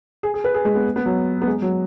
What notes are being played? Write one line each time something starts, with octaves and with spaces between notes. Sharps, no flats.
G#4
G#4
B4
G#4
G#3
B3
B3
F#3
B3
G#3
F#3